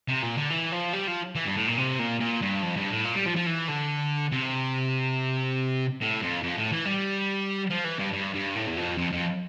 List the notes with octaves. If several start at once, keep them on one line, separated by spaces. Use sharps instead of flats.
C3
A#2
D3
E3
F3
G3
F3
E3
G2
A2
A#2
C3
A#2
A#2
G2
F2
G2
A2
A#2
G3
F3
F3
E3
D3
C3
A2
F2
F2
A2
E3
G3
F3
E3
G2
G2
G2
A2
E2
F2
F2
F2